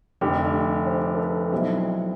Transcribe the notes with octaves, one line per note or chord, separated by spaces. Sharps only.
F1 F2 D3 G4
C5
A4
B4
B1 B2 G3 C4 E4